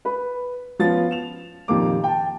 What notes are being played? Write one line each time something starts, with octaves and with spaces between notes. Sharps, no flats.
B4 B5
F3 B3 C#4 F4 A6
E7 F7
F2 A#2 D#3 A#3 G4 D6
G5 A5